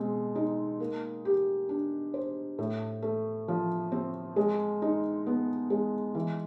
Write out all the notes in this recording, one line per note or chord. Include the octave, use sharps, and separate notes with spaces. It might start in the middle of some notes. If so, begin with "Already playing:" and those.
Already playing: B2 G#3 C4
D#4
A#3
G4
D4
C5
A2
A3
F3
C4
G#3
D#4
B3
G#3
E3